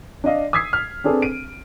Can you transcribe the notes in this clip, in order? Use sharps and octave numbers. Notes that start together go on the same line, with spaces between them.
D4 D5 D#5 F5
D#6 E6 G#6 B6 C7
F6
C4 D4 G#4 A4 B4
D7 D#7